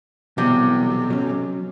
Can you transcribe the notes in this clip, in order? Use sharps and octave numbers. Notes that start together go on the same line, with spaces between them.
B1 C3 E3 F#3 G3
F#3 C#4